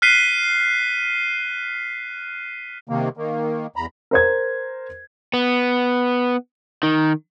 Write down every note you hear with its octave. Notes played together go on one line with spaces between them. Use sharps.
F6 F#6 B6 C7 D#7 G7
C3 D#3 A#3
D#3 A#3
E2 A#5 B5
A#4 C5 G#6
B3
D#3